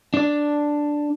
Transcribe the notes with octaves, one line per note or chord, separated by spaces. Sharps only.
D4 D5